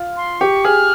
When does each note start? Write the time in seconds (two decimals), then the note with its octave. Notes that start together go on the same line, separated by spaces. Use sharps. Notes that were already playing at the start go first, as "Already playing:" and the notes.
Already playing: F4
0.17 C6
0.40 G4 C#6
0.65 G#4 F6